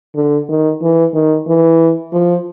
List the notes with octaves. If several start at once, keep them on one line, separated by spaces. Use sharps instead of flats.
D3
D#3
E3
D#3
E3
F3